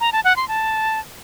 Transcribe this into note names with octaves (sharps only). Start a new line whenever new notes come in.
A#5
A5
F#5
C6
A5